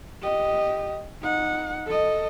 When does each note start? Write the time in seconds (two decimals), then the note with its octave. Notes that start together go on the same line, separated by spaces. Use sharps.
0.22 G4 D#5
1.22 D#4 F#5
1.86 A4 D#5